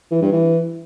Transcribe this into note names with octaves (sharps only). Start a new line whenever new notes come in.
E3
G2
E3